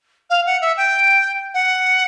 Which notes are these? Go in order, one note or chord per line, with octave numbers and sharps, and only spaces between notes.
F5
F#5
E5
G5
F#5